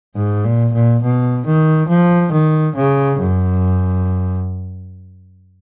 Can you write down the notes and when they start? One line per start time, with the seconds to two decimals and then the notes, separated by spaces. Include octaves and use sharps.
0.15 G#2
0.44 A#2
0.73 A#2
1.02 B2
1.46 D#3
1.88 F3
2.32 D#3
2.76 C#3
3.20 F#2